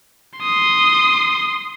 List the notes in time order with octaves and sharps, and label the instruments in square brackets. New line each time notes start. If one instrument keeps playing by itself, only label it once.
[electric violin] C6 D#6